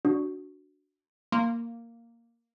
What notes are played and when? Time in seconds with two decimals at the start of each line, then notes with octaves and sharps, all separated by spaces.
0.05 D4 F#4
1.32 A#3 C6